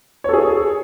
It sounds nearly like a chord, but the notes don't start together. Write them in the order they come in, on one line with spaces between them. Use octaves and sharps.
C#5 A4 G#4